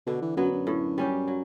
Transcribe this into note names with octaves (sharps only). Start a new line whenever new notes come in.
B2 D3
E3
F#2 F#3 B3
F#2
A2
G3 C#4 G4
F#3